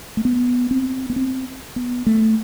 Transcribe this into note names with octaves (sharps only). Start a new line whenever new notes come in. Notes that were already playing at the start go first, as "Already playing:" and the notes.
A3
B3
C4
B3
C4
B3
A3